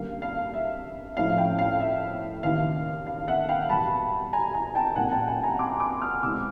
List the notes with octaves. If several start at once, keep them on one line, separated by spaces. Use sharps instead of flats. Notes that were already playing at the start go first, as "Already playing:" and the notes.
Already playing: F#2 D3 G3 A#3 F5
F5
E5
A2 F3 A3 C#4 E4 F5
F5 G5
F5
E5
D#2 C#3 E3 F5
F5
E5 F#5
F5 G5
E2 B2 G3 A5 B5
G#5 A#5
G#5 A#5
G5 A5
C2 A#2 G3 A#3 C#4 F#5 G#5
G5 A5
F#5 G#5
G#5 A#5
C6 D6
C6 D6
D#6 F6
C2 B2 G#3 C4 E4 D6 E6